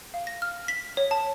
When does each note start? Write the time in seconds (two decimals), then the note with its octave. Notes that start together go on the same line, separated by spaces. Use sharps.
0.14 F5
0.27 A#6
0.42 F6
0.68 B6
0.97 C#5
1.11 A5